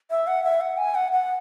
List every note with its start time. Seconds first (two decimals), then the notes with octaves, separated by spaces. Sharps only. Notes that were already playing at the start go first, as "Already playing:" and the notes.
0.11 E5
0.27 F#5
0.44 E5
0.61 F#5
0.78 G#5
0.95 F#5
1.12 F#5